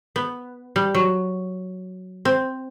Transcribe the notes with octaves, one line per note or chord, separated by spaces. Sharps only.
B3
G3
F#3
C4